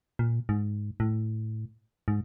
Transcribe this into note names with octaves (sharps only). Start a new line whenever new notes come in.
A#2
G#2
A2
G#2